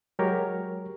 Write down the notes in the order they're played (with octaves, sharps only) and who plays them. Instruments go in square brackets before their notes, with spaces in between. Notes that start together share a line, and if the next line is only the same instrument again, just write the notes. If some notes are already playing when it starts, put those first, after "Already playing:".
[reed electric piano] F#3 G#3 G4 A#4 C#5